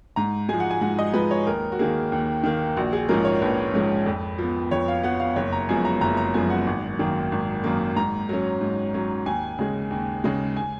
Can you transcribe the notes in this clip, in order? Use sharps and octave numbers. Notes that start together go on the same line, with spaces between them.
G#2 A#5
F3 G#3 G#5
F#5
G#5
G#2 F#5
D#5
F3 G#3 B4
C#5
D#2 A#4
F#4
D#3 A#3 G#4
D#2
D#3 A#3
A#1 F#4
G#4
G#2 F3 G#3 C#4 A#4
C#5
A#1 B4
G#2 F3 G#3 C#4
F2
F3 B3
F2 C#5
F5
F3 B3 F#5
F5
F#1 C#5
A#5
F#2 F3 G#3 B3 G#5
A#5
F#1 A#5
A#5
F#2 F3 G#3 B3 G#5
F#5
G#1
F#2 D#3 A#3
G#1
F#2 D#3 A#3
G#2 A#5
F#3 C#4
G#2
F#3 C#4
D#2 G#5
C#3 G#3
D#2
C#3 G#3
G#5